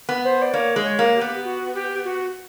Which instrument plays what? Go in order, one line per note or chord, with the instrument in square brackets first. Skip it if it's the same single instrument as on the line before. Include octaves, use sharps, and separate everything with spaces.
[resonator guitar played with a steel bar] B3
[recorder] C5
D5
[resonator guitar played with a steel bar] A#3 [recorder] C#5
[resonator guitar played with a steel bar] G#3
[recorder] C#5
[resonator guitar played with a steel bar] A#3
[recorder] G4
[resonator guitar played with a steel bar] B3
[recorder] F#4
G4
F#4